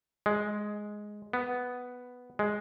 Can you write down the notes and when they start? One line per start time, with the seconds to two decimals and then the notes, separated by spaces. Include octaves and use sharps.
0.26 G#3
1.33 B3
2.39 G#3